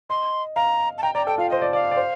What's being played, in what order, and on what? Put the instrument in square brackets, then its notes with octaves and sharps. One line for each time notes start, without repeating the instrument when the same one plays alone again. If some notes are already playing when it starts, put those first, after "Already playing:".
[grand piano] D#5 [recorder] C6
[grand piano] F5 [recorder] A#5
[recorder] A5
[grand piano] G5 [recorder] A#5
[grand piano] D5 [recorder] A#5
[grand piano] A4 [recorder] G5
[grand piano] F4 [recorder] F5
[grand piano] C5 [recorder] D#5
[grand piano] D5
[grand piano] D5 [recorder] F5
[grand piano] D5
C5